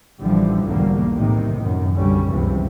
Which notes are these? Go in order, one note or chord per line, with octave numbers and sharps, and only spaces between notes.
A1 D3 E3 F3 G3
B1 E2 G#2 D3 G3 A#3
A2 C3 D#3
F#2 D#3
B1 D3 G3 C#4
G1 C#2 C3 E3 F3